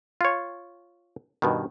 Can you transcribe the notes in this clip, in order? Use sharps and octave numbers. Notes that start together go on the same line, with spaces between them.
F4 C#5
G2 B2 D#3